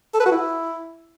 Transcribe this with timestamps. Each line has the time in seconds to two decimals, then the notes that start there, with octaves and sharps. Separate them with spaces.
0.14 A4
0.20 B4
0.26 F#4
0.32 E4